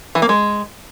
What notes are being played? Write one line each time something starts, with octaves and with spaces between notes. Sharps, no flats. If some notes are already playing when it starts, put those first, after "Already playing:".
E3
A#3
G#3